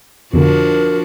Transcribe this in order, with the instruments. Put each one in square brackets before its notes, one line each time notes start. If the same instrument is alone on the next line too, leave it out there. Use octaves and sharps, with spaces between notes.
[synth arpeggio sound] F2 B2 D3 [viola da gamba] F3 D4 F#4 [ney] A#4